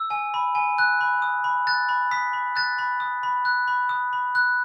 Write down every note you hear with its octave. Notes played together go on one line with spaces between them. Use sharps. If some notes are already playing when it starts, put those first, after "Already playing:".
Already playing: E6
G#5
B5
G#5
F#6
B5
D#6
B5
F#6 A6
B5
D#6 B6
B5
F#6 A6
B5
D#6
B5
F#6
B5
D#6
B5
F#6